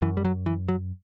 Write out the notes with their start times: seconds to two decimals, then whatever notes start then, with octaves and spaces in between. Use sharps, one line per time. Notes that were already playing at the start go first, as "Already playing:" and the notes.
0.02 F#2 E3
0.17 G3
0.25 F#3
0.46 E3
0.68 F#3